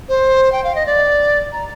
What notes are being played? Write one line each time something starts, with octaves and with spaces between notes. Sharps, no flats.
C5
G5
F5
D#5
D5
A#5